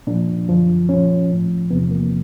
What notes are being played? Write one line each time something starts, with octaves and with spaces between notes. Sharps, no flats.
A#2 F3 D4
F#2 D3 F3
A#2 F3 C#4
A2 F3
E2 C3 F3 B3
A#3